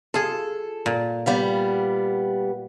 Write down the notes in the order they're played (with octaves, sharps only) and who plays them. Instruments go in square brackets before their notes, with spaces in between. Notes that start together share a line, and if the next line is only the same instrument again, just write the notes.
[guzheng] F4 G#4 [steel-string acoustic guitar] A4
[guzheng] A#2
[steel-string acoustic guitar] G3 B3 F5